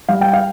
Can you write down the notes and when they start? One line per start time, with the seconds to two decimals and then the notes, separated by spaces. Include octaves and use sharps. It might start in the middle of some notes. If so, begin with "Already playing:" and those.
0.09 G3 F5
0.21 G5
0.33 F5